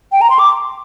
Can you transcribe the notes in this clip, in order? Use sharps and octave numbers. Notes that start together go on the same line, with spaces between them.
G5
A#5
C6
D6